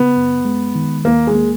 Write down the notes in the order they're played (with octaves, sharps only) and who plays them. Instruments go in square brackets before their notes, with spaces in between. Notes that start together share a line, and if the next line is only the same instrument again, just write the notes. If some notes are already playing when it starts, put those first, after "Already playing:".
Already playing: [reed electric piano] C#3 [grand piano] B3
[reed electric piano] F#2
G#3
D#3
[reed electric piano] D#2 [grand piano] A#3
[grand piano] G#3
[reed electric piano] A#3